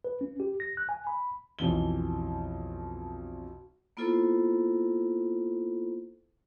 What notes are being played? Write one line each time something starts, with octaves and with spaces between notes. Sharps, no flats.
B4
C#4
G4
A#6
F#6
G#5
B5
B1 F2 E3 G7
A#3 B3 E4 F4 A4 C5